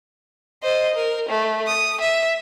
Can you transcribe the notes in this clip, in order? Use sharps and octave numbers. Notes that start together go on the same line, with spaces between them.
C5 D#5
A#4
A3
D#6
E5